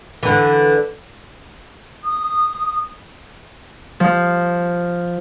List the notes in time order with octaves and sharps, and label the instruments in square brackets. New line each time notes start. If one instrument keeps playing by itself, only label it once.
[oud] D3 E3
[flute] D#6
[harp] F3